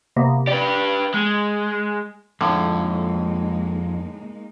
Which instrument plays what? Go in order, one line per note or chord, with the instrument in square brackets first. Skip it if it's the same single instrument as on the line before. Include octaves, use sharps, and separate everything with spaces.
[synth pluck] C3 A#3 B3
[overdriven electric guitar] G4 B4 [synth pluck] D5 G5
[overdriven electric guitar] G#3
[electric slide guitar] F2 F5 [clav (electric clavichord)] A2 D3 [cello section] G#3 A#3 D#4